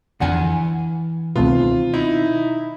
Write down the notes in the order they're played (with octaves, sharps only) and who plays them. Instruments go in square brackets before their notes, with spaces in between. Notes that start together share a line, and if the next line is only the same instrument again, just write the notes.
[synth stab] F2 D3 [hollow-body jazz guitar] E3 F#5 G#5
[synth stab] C#2 A3 B3 [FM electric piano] B2 D#3 C4 [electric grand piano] F4
[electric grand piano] D#4 [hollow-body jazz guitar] E4